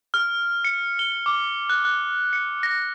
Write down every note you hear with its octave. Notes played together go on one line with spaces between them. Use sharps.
F6
C#7
G7
D6
F#6
F#6
C#7
A#6